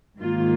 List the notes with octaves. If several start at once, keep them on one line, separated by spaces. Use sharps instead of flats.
G#2 D#3 A#3 F4